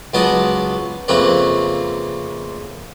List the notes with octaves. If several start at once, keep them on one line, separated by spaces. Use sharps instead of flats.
C#2 F#3 B3 D#5 A5 D6
F2 C#3 A3 A#3 C4 B4